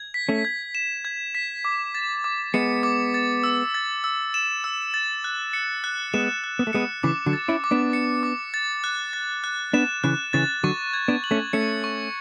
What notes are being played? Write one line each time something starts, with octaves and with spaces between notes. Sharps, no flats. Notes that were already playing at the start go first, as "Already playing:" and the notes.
Already playing: G#6
B6
A3 C#4
G#6
E7
G#6
B6
D6
A6
D6
G#3 B3 C#7
D6
A6
E6
A6
E6
E7
E6
A6
F#6
C#7
F#6
G#3 B3 E7
F#6
B3
A3
G#3 B3 C#7
C#3 E3 D6
D3 F#3
A6
C#4 E4
D6
B3 D4
C#7
D6
A6
F#6
A6
F#6
B3 D4 E7
C#3 E3 F#6
C#3 E3 A6
D3 F#3 C#6
G#6
B3 D4
F#7
A3 C#4
A3 C#4 C#7
C#6